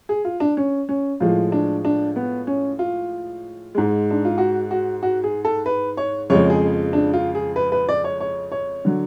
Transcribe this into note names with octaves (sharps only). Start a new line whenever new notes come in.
G#4
F4
D4
C#4
C#4
A2 F3 G#3 F4
D4
D4
B3
C#4
F4
G#2 G#3
D4
F4
F#4
F#4
F#4
G#4
A4
B4
C#5
F2 C#3 F3 G#3 C#5
G#4
D4
F4
G#4
B4
B4
D5
C#5
C#5
C#5
D3 F#3